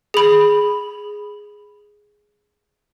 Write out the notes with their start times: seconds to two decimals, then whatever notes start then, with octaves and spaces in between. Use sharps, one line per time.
0.14 G#4 B5